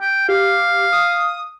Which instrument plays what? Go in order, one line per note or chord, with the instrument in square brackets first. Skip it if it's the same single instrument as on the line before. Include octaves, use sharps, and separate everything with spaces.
[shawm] G5
[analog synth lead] G4 [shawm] F5
[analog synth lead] D#6